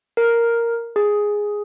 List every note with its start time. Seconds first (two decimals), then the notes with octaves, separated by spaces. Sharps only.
0.17 A#4
0.96 G#4